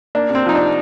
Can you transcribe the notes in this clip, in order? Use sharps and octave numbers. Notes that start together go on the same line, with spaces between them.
A#3 D4
C3
C4
F3 D#4
D4
C3